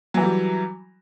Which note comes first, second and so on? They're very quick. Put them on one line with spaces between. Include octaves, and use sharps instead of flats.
F#3 E3 F#4 G3